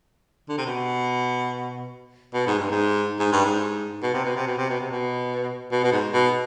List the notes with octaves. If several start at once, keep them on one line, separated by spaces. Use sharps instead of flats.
D3
C3
B2
B2
G#2
G2
G#2
G#2
G2
G#2
B2
C3
B2
C3
B2
C3
B2
C3
B2
B2
B2
G#2
B2